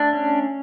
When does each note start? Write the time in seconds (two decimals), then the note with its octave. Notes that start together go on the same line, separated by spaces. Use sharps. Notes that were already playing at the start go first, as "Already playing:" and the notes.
Already playing: A3 D4
0.13 C#4